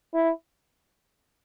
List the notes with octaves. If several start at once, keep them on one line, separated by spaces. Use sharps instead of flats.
E4